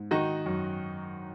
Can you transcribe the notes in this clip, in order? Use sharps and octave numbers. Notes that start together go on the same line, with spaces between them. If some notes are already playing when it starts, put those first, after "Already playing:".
Already playing: G#2
D#3 D#4 F#4
F#2